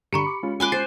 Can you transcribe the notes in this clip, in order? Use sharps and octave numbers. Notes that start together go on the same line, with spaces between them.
G2 D3 D4 G4 A#5 B5 C#6 C#7
D6
G#3 C#4 F4
G#5 B5 C6 D6 F#6
C5 A6 C7